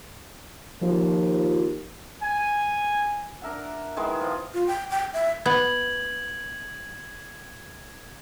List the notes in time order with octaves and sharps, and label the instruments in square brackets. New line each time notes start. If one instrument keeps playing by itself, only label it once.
[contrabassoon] D#2 [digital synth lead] F3
[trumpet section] G#5
[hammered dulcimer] D4 A#4 E5 F#5
D#3 E3 G#3 B3
F3 F4
[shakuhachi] F4
G5
G5
E5
[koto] B3 [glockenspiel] G#6 F#7